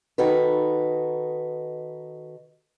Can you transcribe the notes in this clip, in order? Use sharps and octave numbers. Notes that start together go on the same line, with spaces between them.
D#3 D#4 F#4 A4 B4